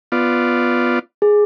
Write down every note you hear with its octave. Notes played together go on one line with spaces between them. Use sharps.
B3 F4 D5
G#4